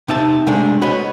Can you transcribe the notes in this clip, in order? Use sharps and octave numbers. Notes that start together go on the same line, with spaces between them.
C3 D#4 E5 A5
C3 G#3 A3 D4
F#4 B4 C#5 D#5